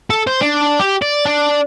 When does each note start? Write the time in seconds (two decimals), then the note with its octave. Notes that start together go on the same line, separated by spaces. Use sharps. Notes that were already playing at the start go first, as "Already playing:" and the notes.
0.10 A4
0.27 C5
0.41 D4
0.80 G4
1.02 D5
1.25 D4